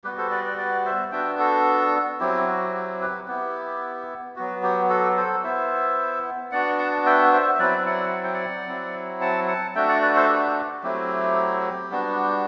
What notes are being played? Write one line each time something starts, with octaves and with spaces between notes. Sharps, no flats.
G3 B3 F#4 G4 B4
A4 C5
B4 D5
B4 D5
B4 D5
C5 E5
B3 D4 F#4 E5 G5
F#4 A4
F#3 C4 E4 G4
F#4
G4
G4 B4
B3 E4 G4
F#3 B3 F#4
G4
F#4 A4
A4 C5
B3 E4 C5 E5
B3 D4 F#4 D5 F#5
F#5 A5
E5 G5
C5 E5
E5
F#3 C4 E4 B4 D5
E5
D5 F#5
F#5
G5
D5 F#5
F#3 C4 E4
F#5 A5
F#5 A5
A3 D4 F#4 E5 G5
D5 F#5
B4 D5
A4 C5
G4 B4
F#3 A3 C4 E4 G4
G3 B3 D4 F#4